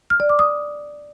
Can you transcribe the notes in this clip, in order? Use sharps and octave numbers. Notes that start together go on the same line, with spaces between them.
F6
D5
D6
D#6